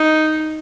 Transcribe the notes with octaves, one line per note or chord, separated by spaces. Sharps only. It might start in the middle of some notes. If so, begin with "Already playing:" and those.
Already playing: D#4